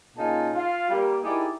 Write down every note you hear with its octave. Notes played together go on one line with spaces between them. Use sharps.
A#2 C#3 D#4 F4 G#5 A5
F4 F5
G3 A#3
D#4 E4 G4 G#4 A#4 D5